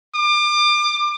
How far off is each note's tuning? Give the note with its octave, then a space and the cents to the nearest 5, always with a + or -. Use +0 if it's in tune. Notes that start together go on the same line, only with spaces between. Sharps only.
D6 +35